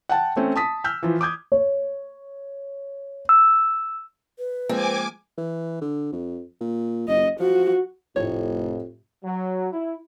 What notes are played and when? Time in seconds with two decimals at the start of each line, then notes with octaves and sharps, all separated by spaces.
0.09 F#5 G5 A5
0.36 A3 C4 C#4
0.56 A5 D#6 B6
0.84 E6 F6 G6 B6
1.03 E3 F3
1.21 D6 D#6 G6 G#6
1.52 C#5
3.29 E6
4.39 B4
4.69 F3 G#3 A#3 C4 G#5 D6
5.38 E3
5.81 D3
6.13 F2
6.61 A#2
7.08 F#1 D#5
7.40 F3 F#4
8.16 F1 F2 A2 G4 C#5
9.24 F#3
9.72 E4